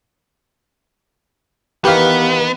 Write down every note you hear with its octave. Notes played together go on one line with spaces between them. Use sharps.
D#3 E3 B3 G4 F5